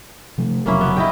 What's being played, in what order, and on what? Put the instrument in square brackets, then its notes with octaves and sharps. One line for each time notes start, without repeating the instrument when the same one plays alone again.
[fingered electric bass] C3 F3 A3
[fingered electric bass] F1 C#3 F#3 [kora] A#3 C#4 E4
[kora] B3
E4 D#5 G5